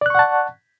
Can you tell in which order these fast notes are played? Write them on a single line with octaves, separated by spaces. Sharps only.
D5 F#6 C#6 F#5 A5